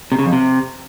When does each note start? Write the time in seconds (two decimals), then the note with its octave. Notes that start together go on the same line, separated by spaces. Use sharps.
0.12 C3
0.19 C#3
0.25 F2
0.32 C3